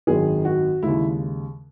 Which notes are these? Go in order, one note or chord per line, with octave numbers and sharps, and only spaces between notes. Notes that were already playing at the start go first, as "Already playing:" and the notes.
G#1 F#2 D#3 F#3 G#4
F#4
D#2 C#3 G#3 E4